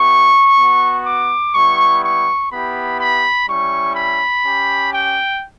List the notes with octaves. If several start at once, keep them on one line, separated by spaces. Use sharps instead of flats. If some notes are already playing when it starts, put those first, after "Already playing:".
Already playing: B3 E4 G4 C#6
B3 F#4
D6
G3 B3 E4 C#6
C#6
B3 E4 G4 B5
B5
G3 C#4 E4 C#6
B5
C#4 G4
G5